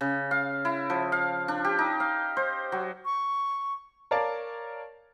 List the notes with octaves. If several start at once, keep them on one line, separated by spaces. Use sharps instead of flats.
C#3
F5
E4
F3
F5
D4
G4
D#4
F5
C5
F#3
C#6
A#4 C#5 D5 F5 A5 A6